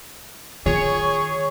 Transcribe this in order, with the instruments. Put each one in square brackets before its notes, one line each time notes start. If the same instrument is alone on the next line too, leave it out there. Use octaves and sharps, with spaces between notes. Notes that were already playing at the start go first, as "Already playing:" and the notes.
[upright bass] D#3 F4 [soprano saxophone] G#4 [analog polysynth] C#5